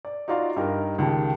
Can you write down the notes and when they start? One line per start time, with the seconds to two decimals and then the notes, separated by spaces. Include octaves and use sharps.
0.05 D5
0.28 D#4 F4 F#4 D5 F5 C6
0.56 G2 D#4 G4 A#4
0.98 C#2 D#3 G4 A5